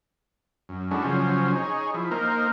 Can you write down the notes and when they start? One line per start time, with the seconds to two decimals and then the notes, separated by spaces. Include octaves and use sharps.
0.69 F#2
0.91 G#3 C#4 D4 E4 F#4 A4
1.04 C#3 F3 F#3 C#4 C5
1.55 D#4 G#4 C#5
1.94 F3 E4
2.11 A#3 D#4 A#4 C5